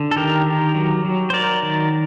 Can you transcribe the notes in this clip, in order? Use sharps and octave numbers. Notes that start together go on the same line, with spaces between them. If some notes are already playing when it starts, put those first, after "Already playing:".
Already playing: D3
A4
D#3 G4 A#4
D#3
F#3
F#3
C5
F#3 A#4 D5
D#3